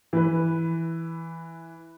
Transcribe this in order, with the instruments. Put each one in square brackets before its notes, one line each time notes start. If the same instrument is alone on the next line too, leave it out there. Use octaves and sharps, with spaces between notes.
[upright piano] E3 B4